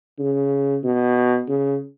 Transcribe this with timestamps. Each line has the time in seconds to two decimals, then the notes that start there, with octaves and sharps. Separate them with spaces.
0.19 C#3
0.84 B2
1.48 C#3